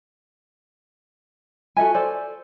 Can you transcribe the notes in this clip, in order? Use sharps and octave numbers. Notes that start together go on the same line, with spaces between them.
F#4 A4 E5 G#5
A4 C5 D5 G#5